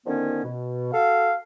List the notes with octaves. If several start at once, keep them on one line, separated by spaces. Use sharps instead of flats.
D3 D#3 F3 B3 C#4
B2
F#4 A4 F5